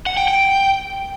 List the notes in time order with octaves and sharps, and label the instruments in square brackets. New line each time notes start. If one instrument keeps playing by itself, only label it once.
[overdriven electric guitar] F#5
G5
G5